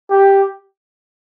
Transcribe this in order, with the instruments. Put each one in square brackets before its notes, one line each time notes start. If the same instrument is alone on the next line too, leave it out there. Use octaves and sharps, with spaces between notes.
[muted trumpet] G4